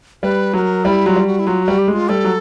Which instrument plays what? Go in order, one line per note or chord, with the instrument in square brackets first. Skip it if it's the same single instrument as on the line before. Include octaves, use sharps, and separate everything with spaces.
[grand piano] G3 [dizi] B4
[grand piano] F#3 [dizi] B4
[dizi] A#4
[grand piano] G3 [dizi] E4
[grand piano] F#3 [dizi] F#4
[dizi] F4
[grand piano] G3
[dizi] F#4
E4
[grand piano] F#3 [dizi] F4
[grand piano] G3 [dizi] F#4
[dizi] G4
[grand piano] G#3
[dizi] F4
[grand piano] G3 [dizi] A4
[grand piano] F#3